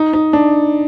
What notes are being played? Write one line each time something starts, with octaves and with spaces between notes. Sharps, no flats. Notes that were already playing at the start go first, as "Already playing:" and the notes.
Already playing: D#4
D#4
D4